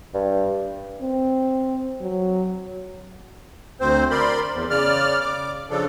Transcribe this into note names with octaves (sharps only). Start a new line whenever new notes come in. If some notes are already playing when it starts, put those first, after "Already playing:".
G2
C4
F#3
D2 C4 C5
A#4 D5 B5 C6
E2
C#3 D5 F6
D6
C#3 F3 D4 A4